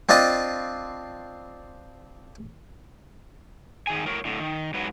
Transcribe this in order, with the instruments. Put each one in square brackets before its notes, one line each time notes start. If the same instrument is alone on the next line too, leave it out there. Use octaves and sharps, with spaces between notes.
[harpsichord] C4 D4 F4 D#5 A5
[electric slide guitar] D#3 G#4 G#5
A2 A#4 C#5
A2 D3
D#3
G#2 F#3 B4